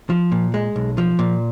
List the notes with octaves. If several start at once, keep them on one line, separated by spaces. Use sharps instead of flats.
F3
A#2
G#3
B1
F3
A#2